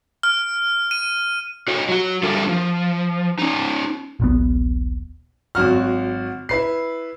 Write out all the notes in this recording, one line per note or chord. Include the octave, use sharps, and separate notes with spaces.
F6
D#7
F#4 C#5 D#5
F#3 F#4
G3 D4 F4 A4 A#4 E5
F3
C#4 D#4
D#1 A#1 B3
G#1 F#3 F#4 F6
E4 B4 C7